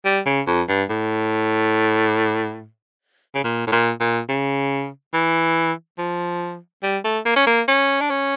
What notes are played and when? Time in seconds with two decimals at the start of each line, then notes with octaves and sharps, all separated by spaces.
0.05 G3
0.26 C#3
0.47 F2
0.69 G2
0.90 A2
3.35 C#3
3.44 A#2
3.67 A2
3.72 A#2
4.00 A#2
4.29 C#3
5.13 E3
5.98 F3
6.83 G3
7.04 A3
7.25 A#3
7.36 C#4
7.47 A#3
7.68 C#4
8.01 D4
8.10 C#4